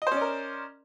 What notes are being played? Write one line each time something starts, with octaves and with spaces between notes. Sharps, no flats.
C#4 A#4 C5 D5 D#5